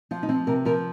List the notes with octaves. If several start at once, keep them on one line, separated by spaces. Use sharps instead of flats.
F3 F4
D#4
F3 C4
C3 A#4
F3 A#4